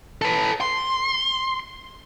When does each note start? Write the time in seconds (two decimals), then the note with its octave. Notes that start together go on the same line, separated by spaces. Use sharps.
0.22 A4 B4
0.61 C6